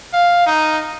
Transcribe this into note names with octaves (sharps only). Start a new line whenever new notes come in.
F5
D#4